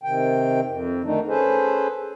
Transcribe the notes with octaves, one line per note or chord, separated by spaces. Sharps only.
C3 D#3 G5
F2
D3 D#3 A3 D4 D#4
C#4 G#4 A4 B4 C5